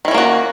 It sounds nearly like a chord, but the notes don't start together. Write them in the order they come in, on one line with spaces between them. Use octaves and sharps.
D#3 E4 C#4 A#3 F#4